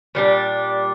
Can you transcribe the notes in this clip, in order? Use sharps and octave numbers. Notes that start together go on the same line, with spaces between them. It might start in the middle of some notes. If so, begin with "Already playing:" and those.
A#2 G3 D4